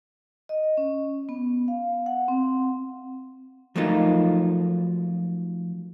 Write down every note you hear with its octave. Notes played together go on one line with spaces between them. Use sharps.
D#5
C#4
B3
F5
F#5
C4
F3 F#3 A3 A#3 D#4 F4